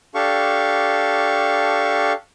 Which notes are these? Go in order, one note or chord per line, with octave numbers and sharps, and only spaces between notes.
D4 G4 A4 F5 C#6